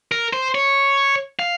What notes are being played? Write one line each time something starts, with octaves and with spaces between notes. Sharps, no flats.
A#4
C5
C#5
F5